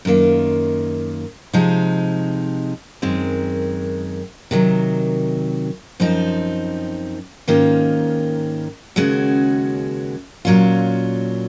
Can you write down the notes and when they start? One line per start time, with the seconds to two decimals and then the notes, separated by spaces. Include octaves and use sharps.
0.05 F#2 D#3 A#3 F4
1.53 C3 F3 G#3 D#4
3.02 F#2 D#3 G#3 C4
4.51 C3 D#3 F#3
6.00 F#2 F3 C4 D#4
7.47 G#2 D#3 A#3 C#4 F4
8.96 D#2 C#3 G#3 C#4 F#4
10.45 A#2 F#3 C#4 F4